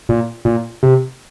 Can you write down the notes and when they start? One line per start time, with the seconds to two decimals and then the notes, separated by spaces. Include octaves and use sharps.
0.09 A#2
0.45 A#2
0.83 C3